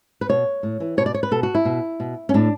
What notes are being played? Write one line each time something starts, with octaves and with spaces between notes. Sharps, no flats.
B4
B2 C#5
A2
E3
B2 C#5
D5
C#5
B4
B2 A4
F#4
E4
B2
B2
C#4
A2 D4